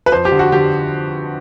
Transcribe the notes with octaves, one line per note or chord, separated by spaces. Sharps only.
B4
F2 C5
G4
D3
F#4
D3 G4